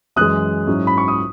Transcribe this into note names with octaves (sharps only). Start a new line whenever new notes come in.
F#2 E3 G#3 D#6 F#6
G#2 F#3 C#4 E4
B5
C#6
D#6